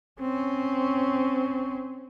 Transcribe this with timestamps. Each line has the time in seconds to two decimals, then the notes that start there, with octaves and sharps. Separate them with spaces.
0.20 C4 C#4